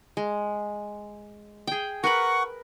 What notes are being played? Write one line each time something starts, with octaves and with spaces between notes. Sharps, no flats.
G#3
G#4 G5
A#4 B4 F#5 B5 C#6